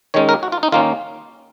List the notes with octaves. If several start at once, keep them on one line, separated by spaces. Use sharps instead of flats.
D#3 G#3 C#4 C#5
A#4
F#4
F4
D#4
D#3 A#3 C#4 F4